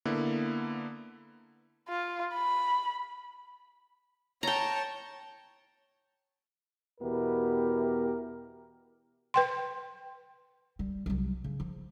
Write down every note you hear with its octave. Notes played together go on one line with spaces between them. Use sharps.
D3 A#3 B3 E4
F4
B5
C#5 G5 A5 A#5
E2 B2 B3 E4 G4 A#4
B4 G5 C6
G3
C2 F#3
C#3
F3